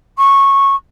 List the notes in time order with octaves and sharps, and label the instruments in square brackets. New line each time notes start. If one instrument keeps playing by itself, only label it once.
[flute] C#6